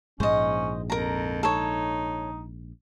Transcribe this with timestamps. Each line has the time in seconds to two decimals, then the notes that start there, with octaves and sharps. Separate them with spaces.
0.20 A#1 G#2 G#3 C#4 C5 D#5
0.90 F2 A#4 A#5
1.43 D#4 A4 C#5